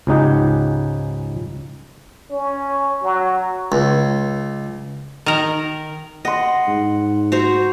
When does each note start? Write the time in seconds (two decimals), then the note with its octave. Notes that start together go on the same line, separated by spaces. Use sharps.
0.07 C#2 G#2 C#3 D#4 G4 F#5
2.31 C#4
3.02 F#3
3.72 C#2
5.26 D#3 A#4
6.25 D#5 F#5 C6
6.68 G#2
7.32 F#4 C5 A#5